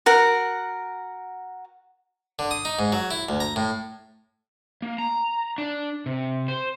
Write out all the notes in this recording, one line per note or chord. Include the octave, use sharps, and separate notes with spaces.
F#4 A#4 F#5
D3
D#6
D#4
G#2
F#3
E4
D2
A#5
A2
A#3
A#5
D4
C3
C5